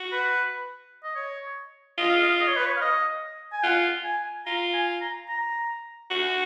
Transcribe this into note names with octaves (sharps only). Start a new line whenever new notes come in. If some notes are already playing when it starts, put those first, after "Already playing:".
Already playing: F#4
B4
D#5
C#5
F4 D#5
F5
D#5
D#5
C#5
B4
C#5
F5
D#5
G#5
F4 F#5
G#5
F4 A#5
G#5
A#5
A#5
F#4